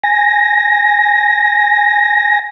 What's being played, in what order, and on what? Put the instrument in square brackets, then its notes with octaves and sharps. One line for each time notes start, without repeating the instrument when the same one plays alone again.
[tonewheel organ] G#5 A#6